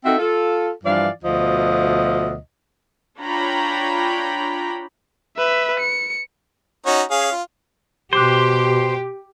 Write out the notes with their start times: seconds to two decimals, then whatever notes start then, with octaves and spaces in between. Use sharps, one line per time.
0.05 C4 D#4 F#4 A4 E5
0.19 F4 A4
0.84 G2 E3 F3 D5 F5
1.24 D2 B2 F3 D#5
3.19 D4 F4 C#5 G5 A#5 B5
5.37 B4 E5
5.80 C#7
6.86 C#4 D#4 F#4
7.11 C#4 G#4 F5
7.32 F4
8.13 B2 G4 C5 C6 D6 F#6